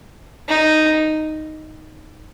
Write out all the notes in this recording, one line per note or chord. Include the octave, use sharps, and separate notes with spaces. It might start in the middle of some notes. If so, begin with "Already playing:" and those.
D#4